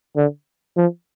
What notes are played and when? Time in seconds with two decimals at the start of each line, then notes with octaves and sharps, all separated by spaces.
0.16 D3
0.77 F3